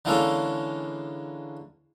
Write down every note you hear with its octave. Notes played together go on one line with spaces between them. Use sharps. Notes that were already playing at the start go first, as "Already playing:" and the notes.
D3 E3 G#3 A#3 C#4 A4